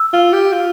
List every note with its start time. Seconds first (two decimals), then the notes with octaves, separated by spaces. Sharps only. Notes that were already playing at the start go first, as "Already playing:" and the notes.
Already playing: E6
0.13 F4
0.33 G4
0.52 F4